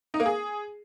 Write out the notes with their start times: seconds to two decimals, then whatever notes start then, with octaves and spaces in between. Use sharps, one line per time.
0.14 D#4
0.20 A#3
0.26 G#4